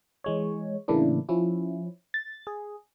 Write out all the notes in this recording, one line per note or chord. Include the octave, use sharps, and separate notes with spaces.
E3 G#3 C#5
A2 C#3 E3 A#3 D4 E4
F3 C#4 E4
A6
G#4